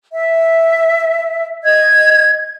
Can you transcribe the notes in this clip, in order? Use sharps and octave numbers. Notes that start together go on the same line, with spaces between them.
E5
D#5 G#6